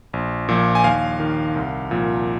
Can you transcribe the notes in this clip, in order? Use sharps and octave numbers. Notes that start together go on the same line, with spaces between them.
A#1
A#2 F3
G#5
D#2 F5
D#3
C2
A#2 F3